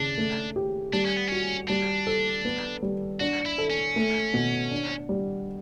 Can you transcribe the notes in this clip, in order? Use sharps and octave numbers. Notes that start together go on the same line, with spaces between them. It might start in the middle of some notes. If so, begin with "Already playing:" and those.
Already playing: C#3 D4
A3
G4
G3 D4
C#4
B3
C#4 F#4
G3 D4
A4
B3
G3
D4 F#4
E4
A4
C#4
A3
B2
D4
G3